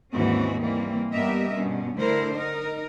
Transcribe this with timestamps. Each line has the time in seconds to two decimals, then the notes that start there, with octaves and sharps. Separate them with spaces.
0.13 D#2 G#2 E3 C4 C#4 F#4
0.59 E3 G3 A#3 C4
1.13 G2 B3 G4 A#4 D#5 E5
1.54 G2 B2 C#4
1.98 D3 A3 E4 A#4 C5
2.35 D#4 A#4